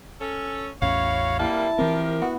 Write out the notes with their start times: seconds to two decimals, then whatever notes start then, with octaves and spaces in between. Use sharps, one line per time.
0.20 C#4 A4
0.82 A1 E2 C#4 E4 F#4 C#5 F5
1.39 F2 G3 A#3 E4 A5
1.79 E3 F3 C4 G4 A#4
2.22 B3 F#4